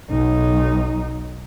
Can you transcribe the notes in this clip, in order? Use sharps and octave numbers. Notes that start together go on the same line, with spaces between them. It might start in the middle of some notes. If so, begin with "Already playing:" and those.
B1 D#4